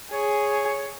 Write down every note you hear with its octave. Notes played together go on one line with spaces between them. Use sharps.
G#4 C#5